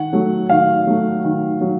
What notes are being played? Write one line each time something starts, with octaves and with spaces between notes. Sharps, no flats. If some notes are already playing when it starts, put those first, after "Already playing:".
Already playing: D#3 F#5
F#3 A3
D#3 F5
F#3 A3
D#3
F#3